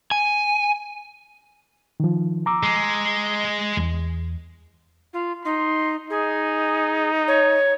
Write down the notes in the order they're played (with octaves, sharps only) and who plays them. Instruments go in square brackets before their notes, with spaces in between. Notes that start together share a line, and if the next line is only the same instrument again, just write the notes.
[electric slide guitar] G#5
[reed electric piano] D#3 F3
A#5 D6 E6
[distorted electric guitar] G#3
[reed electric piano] E2
[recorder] F4
[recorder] D#4 [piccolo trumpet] C6
[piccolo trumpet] D#4 [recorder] G#4
[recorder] C#5